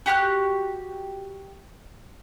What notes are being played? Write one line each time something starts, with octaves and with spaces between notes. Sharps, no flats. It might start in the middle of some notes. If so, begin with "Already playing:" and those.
F#4 G4 D#6 F#6